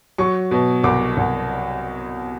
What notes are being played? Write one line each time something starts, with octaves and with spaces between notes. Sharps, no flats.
F#3 C#6
B2
C2 D6
C2